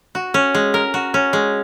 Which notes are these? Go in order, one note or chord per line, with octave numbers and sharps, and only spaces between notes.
F#4
C#4
G#3
A#4
F#4
C#4
G#3